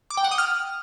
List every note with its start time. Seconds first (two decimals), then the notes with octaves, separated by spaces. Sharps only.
0.10 D6
0.17 G5
0.24 F#5
0.31 D#6
0.38 F6